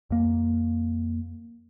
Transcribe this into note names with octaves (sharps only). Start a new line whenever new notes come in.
F2 A#3